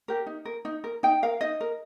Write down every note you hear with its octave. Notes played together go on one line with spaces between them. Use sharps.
G4 A#4
D#4
A#4
D#4
A#4
D#4 G5
A#4 F5
D#4 D#5
A#4